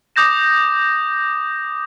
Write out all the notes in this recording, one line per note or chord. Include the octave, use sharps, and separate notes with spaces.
D6 D#6 G6 A#6 E7